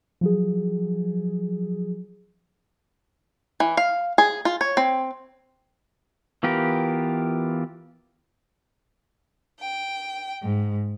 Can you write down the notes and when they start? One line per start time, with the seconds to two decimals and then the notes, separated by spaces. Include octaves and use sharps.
0.21 F3 F#3 G#4
3.60 E3
3.77 F5
4.18 G#4
4.45 F4
4.61 C#5
4.77 C4
6.43 E3 B3 F4 G4 A#4
9.57 G5
10.43 G#2